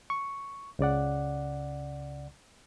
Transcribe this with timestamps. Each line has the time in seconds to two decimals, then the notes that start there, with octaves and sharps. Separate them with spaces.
0.10 C#6
0.79 C#2 C#3 D5 F#5